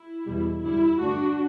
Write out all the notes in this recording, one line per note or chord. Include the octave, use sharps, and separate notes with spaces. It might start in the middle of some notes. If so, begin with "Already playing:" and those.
Already playing: E4
E2 B2 G3
F#2 D3 G3 E4
G2 D3 A3 D4 F#4